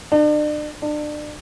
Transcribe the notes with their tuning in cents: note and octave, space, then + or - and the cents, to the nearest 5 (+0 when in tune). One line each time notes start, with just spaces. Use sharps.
D4 +40
D4 +30